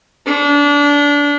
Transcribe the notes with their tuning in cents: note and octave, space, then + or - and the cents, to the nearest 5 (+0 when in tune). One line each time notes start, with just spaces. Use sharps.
D4 -25